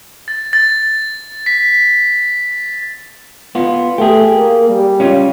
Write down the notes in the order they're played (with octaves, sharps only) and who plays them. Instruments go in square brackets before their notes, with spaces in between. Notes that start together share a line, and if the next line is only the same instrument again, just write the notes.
[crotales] A6
A6
B6
[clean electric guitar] B3 F4
[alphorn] A3 [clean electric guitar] G4 G#4
[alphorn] A#3
G3
[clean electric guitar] C#4 F4